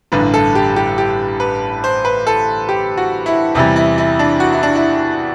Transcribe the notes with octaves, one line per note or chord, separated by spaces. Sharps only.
A1 G2 D3 B4
A4
G4
G4
G4
B4
C5
B4
A4
G4
F#4
E4
E2 C3 E3 G3 E4
E4
E4
D4
F#4
E4
D4
E4